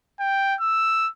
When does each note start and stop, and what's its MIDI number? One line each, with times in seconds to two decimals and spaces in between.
0.20 0.55 79
0.60 1.09 88